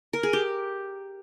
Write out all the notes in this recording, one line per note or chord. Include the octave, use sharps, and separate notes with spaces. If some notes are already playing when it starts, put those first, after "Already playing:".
A#4
G#4
G4